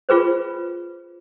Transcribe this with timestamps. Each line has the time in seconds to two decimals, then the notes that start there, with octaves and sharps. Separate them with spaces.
0.09 F4 G#4 B4 C5